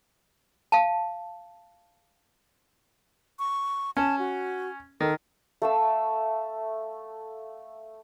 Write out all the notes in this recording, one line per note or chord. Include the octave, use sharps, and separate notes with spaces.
F5 A5
C#6
C#4 A5
F#4
D#3 A4
A3 F5 E6